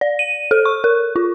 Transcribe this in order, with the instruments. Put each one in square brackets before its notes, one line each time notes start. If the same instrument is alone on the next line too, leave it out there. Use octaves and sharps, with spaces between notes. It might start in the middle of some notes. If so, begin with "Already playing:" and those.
[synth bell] D5
D#7
A4
C#6
A#4
F4